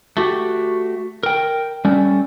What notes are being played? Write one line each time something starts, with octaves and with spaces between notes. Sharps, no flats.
A3 F#4 G4
A#4 G5
G3 A3 C#4